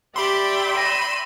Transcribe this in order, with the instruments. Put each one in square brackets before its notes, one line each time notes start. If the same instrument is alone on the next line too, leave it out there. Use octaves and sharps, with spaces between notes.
[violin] G4 [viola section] D5 E5 G5 [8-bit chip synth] B5 C6
[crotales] A#6 [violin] D#7 E7